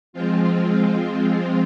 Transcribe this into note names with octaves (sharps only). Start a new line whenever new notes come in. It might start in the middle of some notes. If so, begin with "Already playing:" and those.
F3 G#3 C4 F4